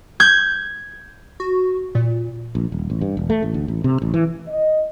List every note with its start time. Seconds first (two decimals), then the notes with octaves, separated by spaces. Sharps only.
0.20 G6 G#6
1.40 F#4
1.95 A#2
2.55 A#1
2.72 D#1
2.90 A1
3.01 G2
3.17 E1
3.30 A3
3.43 A1
3.54 D2
3.68 A1
3.84 C3
4.02 A1
4.14 E3
4.48 D#5